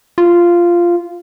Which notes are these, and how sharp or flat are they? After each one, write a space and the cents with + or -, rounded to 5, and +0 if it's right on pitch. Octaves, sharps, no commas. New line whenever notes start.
F4 -10